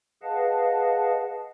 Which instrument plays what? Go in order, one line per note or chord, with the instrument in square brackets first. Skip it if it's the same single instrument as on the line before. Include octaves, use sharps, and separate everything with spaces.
[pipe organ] G#4 B4 D#5 F5 F#5 A5